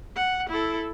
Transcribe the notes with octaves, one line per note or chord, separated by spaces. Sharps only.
F#5
E4 A4